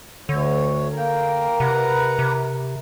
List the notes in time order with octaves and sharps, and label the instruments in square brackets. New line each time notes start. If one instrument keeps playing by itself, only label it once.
[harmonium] D2 C#5 [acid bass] D3
[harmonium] A#3 G5 [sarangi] A#4
[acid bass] C3 [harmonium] B4 F#5 A#5
[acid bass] C3